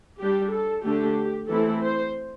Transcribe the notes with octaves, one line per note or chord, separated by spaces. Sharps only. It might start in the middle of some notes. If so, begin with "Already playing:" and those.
G3 D4 G4
A4
D3 A3 D4 G4
E3 A3 C4 E4 A4
C5